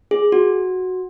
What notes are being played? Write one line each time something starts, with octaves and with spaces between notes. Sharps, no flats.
G#4
F#4